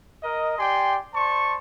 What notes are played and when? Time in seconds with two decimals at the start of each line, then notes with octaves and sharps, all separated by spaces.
0.23 A#4 D#5
0.58 G4 D5 G5 G#5 C6
1.14 C5 D5 A5 C6 C#6